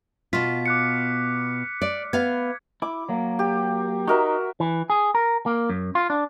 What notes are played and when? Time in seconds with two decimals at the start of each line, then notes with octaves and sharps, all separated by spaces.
0.33 B2 F4 F6 B6
0.66 D6 F#6 C#7
1.82 D5
2.13 B3 F5 G#6
2.82 E4 D6
3.09 F#3 A#3
3.39 G4
4.08 D#4 F#4 A#4 E5
4.60 E3
4.90 G#4
5.15 A#4
5.46 A#3
5.69 F#2
5.95 F4
6.10 D4